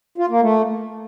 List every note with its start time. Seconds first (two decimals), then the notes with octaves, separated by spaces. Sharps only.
0.18 F4
0.30 A#3
0.41 A3